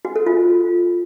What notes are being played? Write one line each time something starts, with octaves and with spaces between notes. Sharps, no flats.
F#4
A4
F4